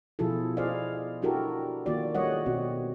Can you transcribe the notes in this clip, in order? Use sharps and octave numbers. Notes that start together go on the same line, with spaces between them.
B2 F3 E4 F4 G#4 A4
E4 G#4 C5 D5 D#5 F5
D4 E4 F#4 G4 A4 A#4
D#3 A#3 F4 F#4 D5
G3 A3 C#5 D#5 F#5
B2 C4 F#4